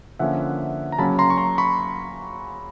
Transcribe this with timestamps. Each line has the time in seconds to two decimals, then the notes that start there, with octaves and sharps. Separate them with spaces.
0.19 D3 F3 A#3 C#4 E5 F#5
0.92 A#5
0.98 C#3 F#3 A#3 C#4 A5 B5
1.19 A#5 C6
1.30 C#6
1.37 A#5 C6
1.58 B5 C#6